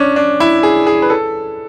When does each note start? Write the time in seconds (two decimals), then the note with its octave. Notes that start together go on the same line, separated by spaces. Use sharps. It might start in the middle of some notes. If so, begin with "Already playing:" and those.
Already playing: C#4 D4
0.16 D4
0.40 E4
0.63 G#4
0.87 G#4
1.02 B4
1.10 A4